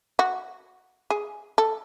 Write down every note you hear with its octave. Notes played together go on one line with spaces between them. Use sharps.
F#4
G#4
A4